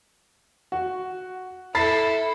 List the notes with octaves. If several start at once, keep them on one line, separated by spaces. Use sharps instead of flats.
F#4
E4 A4 B5 A6 C7